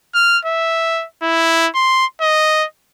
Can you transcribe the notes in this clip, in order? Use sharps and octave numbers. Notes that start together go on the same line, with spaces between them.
F6
E5
E4
C6
D#5